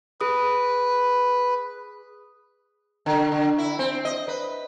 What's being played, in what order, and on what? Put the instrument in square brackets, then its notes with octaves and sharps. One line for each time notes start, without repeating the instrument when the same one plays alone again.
[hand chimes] G#4 D#6 [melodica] B4
[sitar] D3
D3
E4
C4
D#5
B4